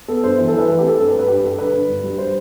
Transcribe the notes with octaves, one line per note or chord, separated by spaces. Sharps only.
B3 A4
G2 C5
E3 B4
A4
E3
B4
A3 A4
C4 G4
A4
G2 A4
B4
G2
B4
G2 G4
G2 A4
D3 B4
D4
G2
G3
C5